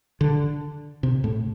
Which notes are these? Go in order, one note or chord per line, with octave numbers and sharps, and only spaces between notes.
D3
C3
A2